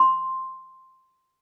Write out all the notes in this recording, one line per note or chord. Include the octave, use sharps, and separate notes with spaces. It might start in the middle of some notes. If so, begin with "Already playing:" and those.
Already playing: C6